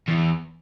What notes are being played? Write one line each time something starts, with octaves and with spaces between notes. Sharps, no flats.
E2